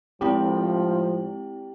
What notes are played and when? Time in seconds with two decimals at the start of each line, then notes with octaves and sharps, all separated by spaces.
0.21 A2 F3 G#3 C4 E4 G4